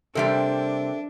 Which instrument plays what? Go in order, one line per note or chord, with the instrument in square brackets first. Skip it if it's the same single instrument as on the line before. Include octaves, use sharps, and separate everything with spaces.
[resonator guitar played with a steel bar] C3 G3 C4 [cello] D4 [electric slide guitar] A4 A#4 E5